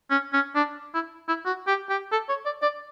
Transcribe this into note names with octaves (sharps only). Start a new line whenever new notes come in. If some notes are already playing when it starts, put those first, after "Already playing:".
C#4
C#4
D4
E4
E4
F#4
G4
G4
A4
C#5
D5
D5